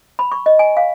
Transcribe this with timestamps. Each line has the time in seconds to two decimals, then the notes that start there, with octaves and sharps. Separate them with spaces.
0.19 B5
0.32 C#6
0.46 D#5
0.59 G#5
0.77 F5